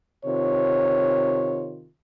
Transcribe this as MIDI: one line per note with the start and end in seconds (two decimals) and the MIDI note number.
0.25 1.90 48
0.25 1.90 51
0.25 1.90 65
0.25 1.72 73